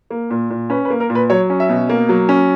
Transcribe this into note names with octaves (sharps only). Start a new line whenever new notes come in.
A#3
A#2
A#2
C#4 B4
B4
A#3
A#4
A#2
B4
F#3 C#5
C#4
E5
B2
A#3
F#3
C#4